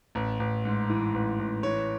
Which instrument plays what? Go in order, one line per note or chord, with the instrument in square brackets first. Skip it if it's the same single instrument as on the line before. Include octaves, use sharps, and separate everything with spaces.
[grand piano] A1
A1
G#2
E3
A1
A1
E3 C#5